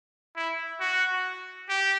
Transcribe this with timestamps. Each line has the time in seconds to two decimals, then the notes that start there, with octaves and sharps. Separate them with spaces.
0.36 E4
0.80 F#4
1.69 G4